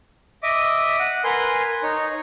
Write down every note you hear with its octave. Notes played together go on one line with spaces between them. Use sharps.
D#5 E5 D6
F#5
A#4 B4 G#5 C6
D#4 C#5